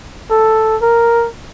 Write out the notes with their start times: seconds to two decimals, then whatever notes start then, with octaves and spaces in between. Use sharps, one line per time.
0.31 A4
0.82 A#4